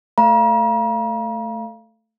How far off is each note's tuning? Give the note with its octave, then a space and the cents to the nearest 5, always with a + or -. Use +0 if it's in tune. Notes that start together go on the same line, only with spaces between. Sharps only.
A3 +0 F5 -20 A#5 +40